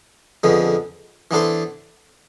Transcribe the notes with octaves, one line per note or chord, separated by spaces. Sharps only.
F2 D3 G#3 B3
E3 B3 D4 A4 C5